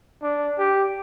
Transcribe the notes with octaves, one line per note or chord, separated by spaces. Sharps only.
D4
G4